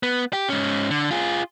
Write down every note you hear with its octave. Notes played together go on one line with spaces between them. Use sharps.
B3
G4
G#2 C#4
D3
F4 G#4